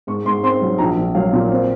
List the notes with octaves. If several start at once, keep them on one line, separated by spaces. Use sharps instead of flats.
G#2 C#6
G#2 C6
C4 C6
F#3
A#1 A#5
A#1
F#3 F5
A#2
C4